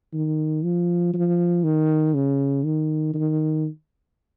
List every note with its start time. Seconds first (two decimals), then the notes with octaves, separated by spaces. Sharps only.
0.13 D#3
0.64 F3
1.14 F3
1.64 D#3
2.14 C#3
2.64 D#3
3.14 D#3